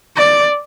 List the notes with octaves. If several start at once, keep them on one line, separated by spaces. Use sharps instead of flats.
D5